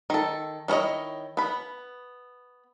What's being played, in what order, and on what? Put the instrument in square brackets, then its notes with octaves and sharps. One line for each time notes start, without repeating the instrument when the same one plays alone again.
[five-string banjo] D#3 A4
D#3 C#4 E4 C#5 D#5
B3 B5